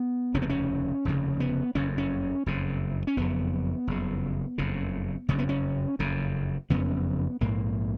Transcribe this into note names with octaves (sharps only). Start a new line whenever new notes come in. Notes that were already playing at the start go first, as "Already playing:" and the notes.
Already playing: B3
F1 D#2 C#3 C#4
B3
C#4
F1 D#2 C#3
B3
F#1 F2 C#3 C#4
C#4
F#1 F2 C#3
C#4
F#1 F2 C#3 B3
F#1 F2 C#3
F#1 F2 C#3
F#1 F2 C#3 C#4
B3
C#4
F#1 F2 C#3
F#1 F2 C#3 B3
A#1 G#2 A#3